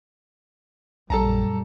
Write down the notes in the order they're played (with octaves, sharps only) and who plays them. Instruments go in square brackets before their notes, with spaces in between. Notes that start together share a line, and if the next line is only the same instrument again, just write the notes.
[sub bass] A#1 [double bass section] F#2 A#2 G3 [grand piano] A4 A5 A#5